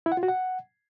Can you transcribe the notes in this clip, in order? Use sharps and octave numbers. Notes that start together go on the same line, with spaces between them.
E4
F#5
F4
F#4
F#5